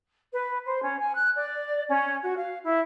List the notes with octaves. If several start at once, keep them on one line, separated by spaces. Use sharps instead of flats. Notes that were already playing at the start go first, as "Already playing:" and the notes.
B4
C5
C#4
G#5
F#6
D5
C#4
F#4
F5
E4